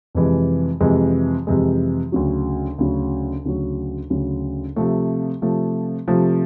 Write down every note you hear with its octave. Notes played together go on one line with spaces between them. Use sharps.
F2 C3 E3 G#3
F2 C3 E3 G#3
F2 C3 E3 G#3
D2 C#3 F#3
D2 C#3 F#3
D2 C#3 F#3
D2 C#3 F#3
C3 F3 A3
C3 F3 A3
C3 F3 A3